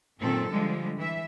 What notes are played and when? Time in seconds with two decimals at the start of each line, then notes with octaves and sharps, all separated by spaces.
0.18 F#2 A#2 D#3 C4 A4
0.51 D3 F3 G3 G#3
0.96 E3 E5